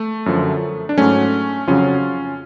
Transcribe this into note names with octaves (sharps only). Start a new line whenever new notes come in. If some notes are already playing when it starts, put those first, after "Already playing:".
Already playing: A3
F#2 D3 F3
D4
G#2 F#3 A3 C#4
F2 C#3 F#3 C#4 F4